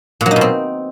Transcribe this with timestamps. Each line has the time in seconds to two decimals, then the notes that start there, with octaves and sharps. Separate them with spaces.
0.21 A#2
0.26 F#3
0.31 D#4
0.36 B2
0.41 C4